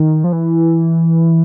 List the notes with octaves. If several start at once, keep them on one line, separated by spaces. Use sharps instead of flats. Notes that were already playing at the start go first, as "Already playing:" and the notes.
Already playing: D#3
F3
E3